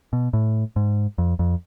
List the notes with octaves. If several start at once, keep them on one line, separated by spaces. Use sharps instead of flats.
B2
A2
G#2
F2
F2